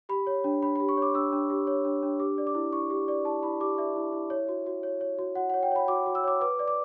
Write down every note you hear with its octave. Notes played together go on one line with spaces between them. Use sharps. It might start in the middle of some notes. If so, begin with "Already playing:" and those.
G4 B5
C#5
D4
D4 B5
G4 B5
C#6
C#5 D6
D4 E6
D4
G4
C#5
D4
D4
G4 D6
D5
D6
E4
E4 C#6
G4
D5
E4 A5
E4 B5
G4 D6
D5 E5
E4
E4
C#5
F#4
F#4
C#5
C#5
F#4
F#4 F#5
C#5 F#5
G5
C#5 B5
F#4 D6
F#4
E6
C#5 D6
B4 D6
D5
D6